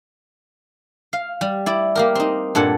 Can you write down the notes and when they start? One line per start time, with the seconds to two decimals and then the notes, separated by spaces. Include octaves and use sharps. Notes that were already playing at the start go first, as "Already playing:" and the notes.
1.13 F5
1.41 G3
1.66 E4 D5
1.95 A#3 G4 A#4
2.15 C4 D#4
2.55 G2 A#2 A4 F#5